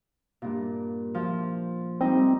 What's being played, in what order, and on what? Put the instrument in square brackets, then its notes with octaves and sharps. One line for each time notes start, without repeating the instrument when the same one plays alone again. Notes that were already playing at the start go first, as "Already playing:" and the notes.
[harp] G2 A#2
F3
[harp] G3 D#4 [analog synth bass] C4